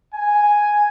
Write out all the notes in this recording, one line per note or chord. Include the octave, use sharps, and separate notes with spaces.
G#5